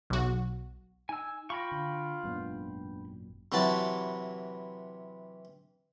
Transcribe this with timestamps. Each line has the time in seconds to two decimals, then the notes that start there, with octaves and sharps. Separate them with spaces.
0.10 B1 F#4
1.09 D#4 G#5 E6
1.50 F4 F5 G5 B5 C#6 A#6
1.72 D3
2.24 G#1 F#2 A#2 G#3 B3 D4
3.52 C3 E3 F#3 F#4 A5